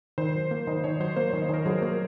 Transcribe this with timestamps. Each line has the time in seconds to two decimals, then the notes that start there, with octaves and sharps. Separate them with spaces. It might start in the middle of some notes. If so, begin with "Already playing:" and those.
0.18 D#3 C5
0.34 F#3
0.51 A#3
0.67 D#3 D#5
0.84 D#3 C#5
1.00 F#3 C5
1.16 A#3 C5
1.29 C#5
1.33 D#3
1.42 D#5
1.49 D#3 A#4
1.65 F#3 G#4
1.78 A#3 A#4